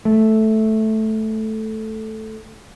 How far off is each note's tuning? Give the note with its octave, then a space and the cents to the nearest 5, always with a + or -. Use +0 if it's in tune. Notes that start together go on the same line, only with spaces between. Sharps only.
A3 -5